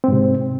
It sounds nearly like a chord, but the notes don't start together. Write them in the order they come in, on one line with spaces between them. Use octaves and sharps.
C4 G#2 C3